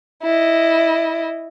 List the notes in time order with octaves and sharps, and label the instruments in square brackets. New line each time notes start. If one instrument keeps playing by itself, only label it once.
[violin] E4 D#5